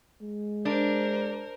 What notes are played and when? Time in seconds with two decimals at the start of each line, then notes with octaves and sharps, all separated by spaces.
0.21 G#3
0.65 D4 A#4 C5